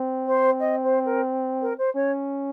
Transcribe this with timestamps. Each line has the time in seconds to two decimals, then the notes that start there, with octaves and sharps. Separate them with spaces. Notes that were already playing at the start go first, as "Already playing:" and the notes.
Already playing: C4
0.26 C5
0.60 D#5
0.83 C5
1.05 A#4
1.61 A#4
1.78 C5
1.95 C#4 C#5